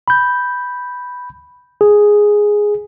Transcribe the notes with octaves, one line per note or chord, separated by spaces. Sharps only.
B5 G6
G#4